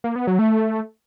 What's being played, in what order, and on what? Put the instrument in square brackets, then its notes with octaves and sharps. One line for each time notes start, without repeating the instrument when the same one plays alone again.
[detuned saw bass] A#3
B3
F#3
A3